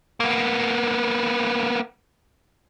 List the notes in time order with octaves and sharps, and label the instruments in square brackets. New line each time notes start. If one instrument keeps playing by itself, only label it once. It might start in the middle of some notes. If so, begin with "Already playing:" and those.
[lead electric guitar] A#3 B3